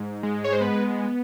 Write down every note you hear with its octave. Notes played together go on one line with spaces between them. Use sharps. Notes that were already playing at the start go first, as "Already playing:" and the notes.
Already playing: G#2
G#3
C#5
C5
B3 B4